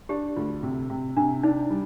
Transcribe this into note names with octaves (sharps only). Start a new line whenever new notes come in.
D4 G4
D2 F4
C3
C3
C3 D4
D4 D#4
G3